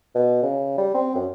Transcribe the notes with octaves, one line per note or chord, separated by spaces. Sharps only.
B2
C#3
G3
C4
F#2